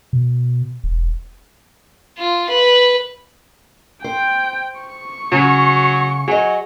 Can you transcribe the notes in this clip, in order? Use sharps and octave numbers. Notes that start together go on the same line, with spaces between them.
B2
E1
F4
B4
C5 G5
C#6
C#3 F#3
F#3 G#4 D#5